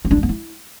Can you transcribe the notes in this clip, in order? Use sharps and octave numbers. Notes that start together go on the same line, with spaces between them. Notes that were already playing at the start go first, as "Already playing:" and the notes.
B3
D4
G3
B3
E4